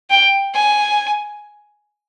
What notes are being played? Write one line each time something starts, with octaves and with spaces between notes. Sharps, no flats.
G5
G#5